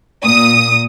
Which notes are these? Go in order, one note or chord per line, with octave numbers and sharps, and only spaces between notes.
A#2 D#6